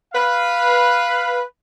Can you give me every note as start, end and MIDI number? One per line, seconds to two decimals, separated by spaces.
0.14 1.41 71
0.14 1.41 77